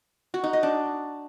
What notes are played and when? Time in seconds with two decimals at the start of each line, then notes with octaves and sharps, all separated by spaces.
0.34 F#4
0.44 D#4
0.53 D#5
0.63 D4